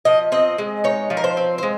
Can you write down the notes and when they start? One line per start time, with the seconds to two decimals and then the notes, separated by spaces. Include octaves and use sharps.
0.05 F3 D#5
0.32 C4 D#5
0.58 G#3
0.84 D#4 C#5
1.10 F3
1.17 A#4
1.24 C5
1.37 C4
1.58 C5
1.63 G#3